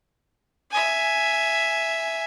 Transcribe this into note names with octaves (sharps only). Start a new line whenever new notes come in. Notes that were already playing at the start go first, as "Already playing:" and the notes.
E5 G#5